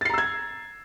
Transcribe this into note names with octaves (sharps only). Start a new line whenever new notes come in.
A#5 E6 G#6 A6 C7